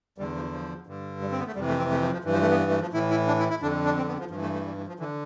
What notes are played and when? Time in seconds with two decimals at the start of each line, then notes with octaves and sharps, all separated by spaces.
0.18 E2 D3 G3
0.36 F3
0.53 F3
0.87 G2 D3
1.21 G3
1.31 C4
1.39 B3
1.47 A3
1.55 F2 C3 E3 G3
1.68 A3
1.79 C4
1.91 A3
2.02 F3
2.13 F3
2.24 G2 E3
2.33 F3
2.42 A3
2.51 B3
2.71 A3
2.82 F3
2.93 A2 E3 E4
3.11 E4
3.27 D4
3.39 E4
3.50 E4
3.62 F2 D3 D4
3.85 D4
3.97 C4
4.08 B3
4.20 F3
4.30 G2 F3
4.35 E3
4.42 A3
4.53 A3
4.65 G3
4.77 E3
4.88 F3
4.99 D3 E3